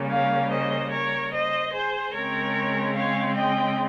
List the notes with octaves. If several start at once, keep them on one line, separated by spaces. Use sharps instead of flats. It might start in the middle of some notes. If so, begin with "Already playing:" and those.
Already playing: C#3 G3 A#3
C#5 F5
C5 D#5
A#4 C#5
C5 D#5
G#4 C5
C#3 G#3 C4 A#4 C#5
C#5 F5
D#5 G5